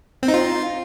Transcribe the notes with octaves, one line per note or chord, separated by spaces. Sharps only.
C4
D#4
F4